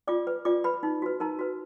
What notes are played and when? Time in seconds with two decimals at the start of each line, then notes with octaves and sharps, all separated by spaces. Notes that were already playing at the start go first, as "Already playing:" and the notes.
0.07 F4 D5 D6
0.27 B4
0.45 F4 D5 D6
0.64 B4 B5
0.83 D#4
1.02 F#4 B4
1.20 D#4 A#4 A#5
1.39 F#4 B4